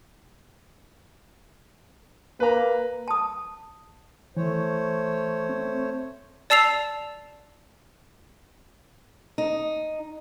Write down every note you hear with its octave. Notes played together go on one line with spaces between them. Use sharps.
A#3 B4 A#5
A5 D#6
E3 A3 C5 C#5
C4
D5 A5 E6 C7 F7
D#4